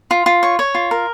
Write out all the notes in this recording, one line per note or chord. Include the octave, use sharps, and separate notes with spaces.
F4
F4
C#5
C#5
F4
A#4